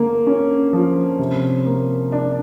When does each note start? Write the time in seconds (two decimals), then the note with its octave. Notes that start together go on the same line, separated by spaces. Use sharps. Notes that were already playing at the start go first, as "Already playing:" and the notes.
Already playing: D3 A#3
0.27 C#4
0.73 F3
1.19 C3
1.66 A#3
2.12 D4